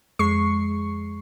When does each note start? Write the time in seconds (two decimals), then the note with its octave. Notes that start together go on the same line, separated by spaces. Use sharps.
0.19 F2 G#3 C#6 C7